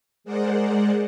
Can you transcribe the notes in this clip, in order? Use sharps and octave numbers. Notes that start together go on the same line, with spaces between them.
G#3 G#4 A#4 C5 D5 F#5